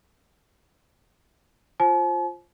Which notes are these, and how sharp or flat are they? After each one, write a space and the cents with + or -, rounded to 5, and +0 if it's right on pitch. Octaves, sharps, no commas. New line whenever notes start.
F4 +0 C5 +15 A5 -45